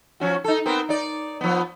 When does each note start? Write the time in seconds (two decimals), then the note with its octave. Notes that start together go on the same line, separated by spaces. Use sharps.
0.20 F3 C#4 F#4
0.44 D#4 A4
0.66 B3 C4 A#4
0.89 D#4 D5
1.41 F3 B3